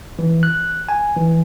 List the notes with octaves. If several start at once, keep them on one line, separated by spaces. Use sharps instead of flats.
E3
F#6
G#5
E3